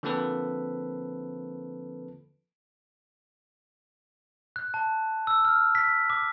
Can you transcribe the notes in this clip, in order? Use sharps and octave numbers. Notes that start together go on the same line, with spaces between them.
D3 F3 A#3 C4 A4 B4
F#6
A5
E6
F6
B6
D6